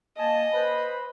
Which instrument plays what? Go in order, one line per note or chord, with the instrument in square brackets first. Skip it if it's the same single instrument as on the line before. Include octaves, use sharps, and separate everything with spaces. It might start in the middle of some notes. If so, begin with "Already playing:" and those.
[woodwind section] A#3 G#5 A5 [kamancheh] D#5
[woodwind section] B4 C5 B5